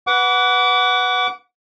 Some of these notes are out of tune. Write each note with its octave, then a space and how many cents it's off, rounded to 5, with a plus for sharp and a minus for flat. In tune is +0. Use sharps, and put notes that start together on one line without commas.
B4 +0 F#5 +0 D6 -35